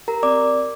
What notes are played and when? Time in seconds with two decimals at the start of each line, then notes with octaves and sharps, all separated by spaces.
0.08 G4 A#4 A#5
0.23 C4 D5 D6